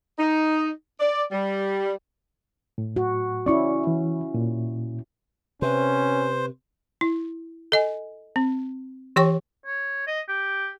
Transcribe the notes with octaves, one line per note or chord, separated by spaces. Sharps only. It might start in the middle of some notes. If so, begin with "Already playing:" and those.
D#4
D5
G3
A2
F#4
C#4 E4 D5 C#6
E3
A#2
C3 C#4 B4 C5
E4
A4 D#5 G#5
C4
E3 G4 C#5 G5 C#6
C#5
D#5
G4